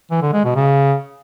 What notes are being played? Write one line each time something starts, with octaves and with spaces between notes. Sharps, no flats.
E3
D3
G#3
B2
C#3